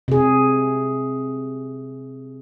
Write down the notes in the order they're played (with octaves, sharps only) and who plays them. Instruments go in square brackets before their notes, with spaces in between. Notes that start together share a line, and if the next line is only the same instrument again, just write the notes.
[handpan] C3 G#4